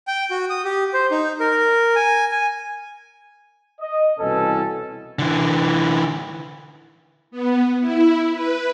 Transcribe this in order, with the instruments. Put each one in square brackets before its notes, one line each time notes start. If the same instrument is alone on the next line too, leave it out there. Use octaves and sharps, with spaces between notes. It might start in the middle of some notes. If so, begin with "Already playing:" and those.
[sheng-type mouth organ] G5
F#4
D#6
G4
C5
D#4
A#4
G#5
G#5
[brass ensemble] D#5
C2 B2 E3 C#4 A4
[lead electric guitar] D3 E3
[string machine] B3
E4
B4